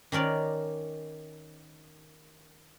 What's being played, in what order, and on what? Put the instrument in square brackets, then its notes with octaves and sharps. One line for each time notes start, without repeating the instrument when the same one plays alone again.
[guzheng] D#3 C#4 A#4 D5